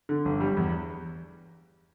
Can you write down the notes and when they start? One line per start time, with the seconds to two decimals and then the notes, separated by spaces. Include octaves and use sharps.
0.09 D3
0.25 G1
0.41 G3
0.57 E2